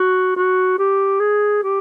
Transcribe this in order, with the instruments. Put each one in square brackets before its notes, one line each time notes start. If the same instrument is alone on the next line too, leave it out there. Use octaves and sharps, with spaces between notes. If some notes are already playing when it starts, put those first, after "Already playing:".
Already playing: [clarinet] F#4
F#4
G4
G#4
G4